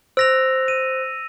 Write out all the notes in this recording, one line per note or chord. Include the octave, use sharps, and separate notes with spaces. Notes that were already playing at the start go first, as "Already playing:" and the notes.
C5 E6 A#6 F7
D#7